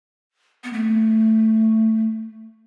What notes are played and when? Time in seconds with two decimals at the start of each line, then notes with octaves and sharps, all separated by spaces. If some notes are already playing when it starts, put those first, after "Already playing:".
0.64 B3
0.73 A3